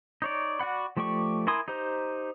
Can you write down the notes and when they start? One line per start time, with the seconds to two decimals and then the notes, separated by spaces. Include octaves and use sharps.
0.22 D#4 C#5 D5
0.59 F#4 D5 F#5 B5
0.97 F3 A3 G4 D5 C#6
1.47 E4 A#4 G#5 C6 D#6
1.68 D#4 G4 C5 A#5